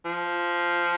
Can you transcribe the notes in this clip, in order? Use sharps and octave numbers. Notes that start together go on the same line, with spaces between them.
F3